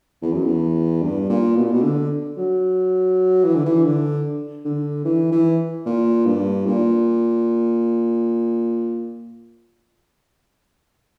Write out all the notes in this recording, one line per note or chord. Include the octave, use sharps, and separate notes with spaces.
E2
F#2
E2
G2
A#2
B2
A#2
B2
D3
F#3
E3
D3
E3
D3
D3
E3
E3
A#2
G2
A#2